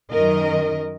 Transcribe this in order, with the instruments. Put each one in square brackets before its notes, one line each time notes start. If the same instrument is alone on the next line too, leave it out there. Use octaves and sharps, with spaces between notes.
[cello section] F#2 D#3 A#4 D#5